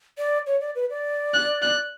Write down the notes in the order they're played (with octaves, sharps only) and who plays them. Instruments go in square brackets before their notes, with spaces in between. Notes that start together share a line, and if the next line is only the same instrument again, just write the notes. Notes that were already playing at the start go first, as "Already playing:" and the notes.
[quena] D5
C#5
D5
B4
D5
[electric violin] F#6
F#6